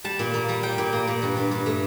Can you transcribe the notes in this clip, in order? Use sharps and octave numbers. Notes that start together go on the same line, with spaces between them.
G3 A5
A#2
A#3
G3
G3 G5
A#2
A#3
A#2
G2
G2
G2
A3